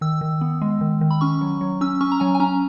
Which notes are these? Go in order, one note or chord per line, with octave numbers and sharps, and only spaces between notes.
D#3 E6
D#3
B3
G#3
D#3
D#3
B5
C#4 C#6
F#3
F#3
C#4 E6
C#4 C#6
A#5
F#3 G#5
G#5
C#4 A#5